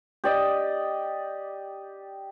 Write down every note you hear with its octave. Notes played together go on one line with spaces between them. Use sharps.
G4 D5 D#5